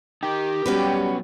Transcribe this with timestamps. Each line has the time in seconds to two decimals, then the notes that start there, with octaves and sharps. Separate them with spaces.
0.23 D#4 G4 A#4
0.66 F#3 G3 B3 C#4 F#4 B4